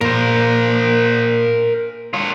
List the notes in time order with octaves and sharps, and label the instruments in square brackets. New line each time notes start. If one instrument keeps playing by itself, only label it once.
[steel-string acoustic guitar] A#2 [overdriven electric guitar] A#4 C5
[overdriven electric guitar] F4 C#5